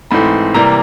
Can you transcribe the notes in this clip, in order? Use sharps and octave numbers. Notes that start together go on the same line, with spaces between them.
G#2 E3 A3 C4 B5
C3 E3 G3 A#3 A#5